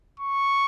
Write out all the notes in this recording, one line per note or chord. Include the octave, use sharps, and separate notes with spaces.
C#6